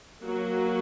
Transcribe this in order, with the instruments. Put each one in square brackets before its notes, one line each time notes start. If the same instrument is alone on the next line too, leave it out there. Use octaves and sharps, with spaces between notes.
[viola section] F#3 A#3 F#4